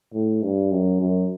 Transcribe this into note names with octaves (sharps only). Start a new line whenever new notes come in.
A2
G2
F#2
F#2